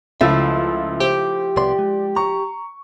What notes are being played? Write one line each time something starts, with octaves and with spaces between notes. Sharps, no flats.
C#2 F3 A3 E4 E5 F5
G4 C5
C2 B3 D5 C6
G#3
A#5 C#6